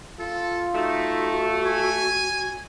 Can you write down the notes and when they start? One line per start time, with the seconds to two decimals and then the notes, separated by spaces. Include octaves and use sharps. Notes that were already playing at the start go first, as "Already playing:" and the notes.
0.20 F4 A4
0.74 A3 D#4 F#4
1.66 G#5